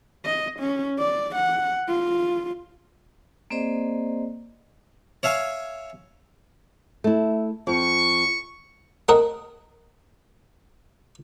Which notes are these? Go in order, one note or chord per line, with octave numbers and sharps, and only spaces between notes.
D#5
C#4
D5
F#5
F4
A#3 C4 G#4 C5 D5 D#5
C#5 E5 F5 G#5
A3 E4
F2 C#6
A3 C4 A#4 D#5 F#5